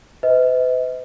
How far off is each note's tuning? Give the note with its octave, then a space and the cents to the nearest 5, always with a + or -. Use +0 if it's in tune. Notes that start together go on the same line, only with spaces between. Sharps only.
B4 +45 D#5 +40